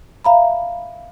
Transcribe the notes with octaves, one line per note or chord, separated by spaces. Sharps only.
E5 F5 A#5 B5